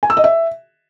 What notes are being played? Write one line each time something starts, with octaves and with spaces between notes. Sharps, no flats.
G#5
E6
D#5
E5